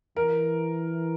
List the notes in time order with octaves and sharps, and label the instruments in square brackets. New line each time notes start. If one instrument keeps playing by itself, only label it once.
[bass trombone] E3 [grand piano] A#4